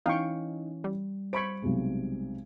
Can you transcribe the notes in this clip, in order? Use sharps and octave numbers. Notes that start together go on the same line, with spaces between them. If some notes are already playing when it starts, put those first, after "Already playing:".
E3 C#4 D#4 F5 G5 C#6
G3
C5 B5 C#6 G#6 D7
B1 C3 G#3